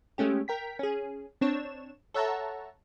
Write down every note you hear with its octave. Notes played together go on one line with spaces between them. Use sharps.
G#3 A3 C#4 G4
A#4 G5 B6
C#4 G#4
C4 D4 C#5 E7
A4 C#5 E5 F#5 A5 A#5